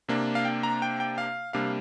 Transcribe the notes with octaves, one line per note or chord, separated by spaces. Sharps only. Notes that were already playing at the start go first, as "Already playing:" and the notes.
C3 A#3 D4
F5
G5
A#5
G5
G5
F5
C3 G3 A#3 D4 F5